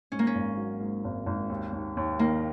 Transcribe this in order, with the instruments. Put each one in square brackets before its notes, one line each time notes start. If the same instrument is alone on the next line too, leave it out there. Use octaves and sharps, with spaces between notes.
[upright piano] G#2 [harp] C#4
[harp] A#3
C#4
[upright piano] G#1
F#3
G#2
G#1
G#1
D#2
D#2
D#2
[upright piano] D#3 [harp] A#3